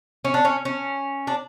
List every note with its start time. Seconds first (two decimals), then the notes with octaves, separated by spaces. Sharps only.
0.25 C#4
0.34 D4
0.45 C#4
0.65 C#4
1.27 D4